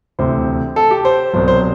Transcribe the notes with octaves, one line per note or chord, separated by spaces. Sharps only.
D2 C3 E3 C5
A4
G4
C5
C2 B2 F#3 C5
C5